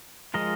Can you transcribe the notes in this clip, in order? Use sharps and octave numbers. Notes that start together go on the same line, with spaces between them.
F3 G#3 F4 A#4 D#5